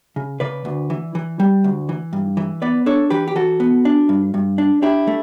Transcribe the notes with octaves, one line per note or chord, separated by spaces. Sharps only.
C#3
C#3 B4 D5
D2
E3
E3
G3
D2
E3
G2
E3
B3 B4 D5
D4 A4 C#5
E3 G4 B4
G4
E3 F#4 A4
B3
D4
G2
G2
D4
D4 E4 G4
A3